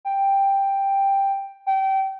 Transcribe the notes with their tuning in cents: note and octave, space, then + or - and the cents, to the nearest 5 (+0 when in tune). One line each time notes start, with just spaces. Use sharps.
G5 +5
G5 -25